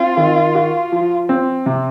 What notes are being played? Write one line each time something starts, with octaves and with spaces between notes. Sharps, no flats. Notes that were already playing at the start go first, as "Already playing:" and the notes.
Already playing: C4 F4
D#3
F#4
F3
C4
C3